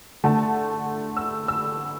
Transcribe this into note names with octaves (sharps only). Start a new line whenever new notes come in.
D3 A3 A5
E6
E6